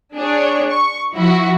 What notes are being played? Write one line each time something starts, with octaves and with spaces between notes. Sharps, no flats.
D4 G#4 C#5
C#6
F3 E4 F#4